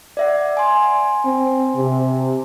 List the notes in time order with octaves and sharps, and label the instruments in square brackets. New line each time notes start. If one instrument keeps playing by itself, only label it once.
[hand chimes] D5 E5 F#5
G#5 C6
[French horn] C4
C3